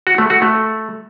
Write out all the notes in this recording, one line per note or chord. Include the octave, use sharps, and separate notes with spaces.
F#4
A3
F#4
A3